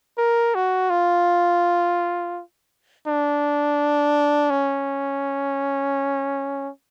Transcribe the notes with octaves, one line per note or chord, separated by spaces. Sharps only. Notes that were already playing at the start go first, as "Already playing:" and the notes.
A#4
F#4
F4
D4
C#4